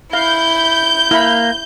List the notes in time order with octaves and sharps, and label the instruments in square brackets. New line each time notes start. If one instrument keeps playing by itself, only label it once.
[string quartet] E4 [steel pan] F5 [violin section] G6
[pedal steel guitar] A#3 [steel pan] E4 B5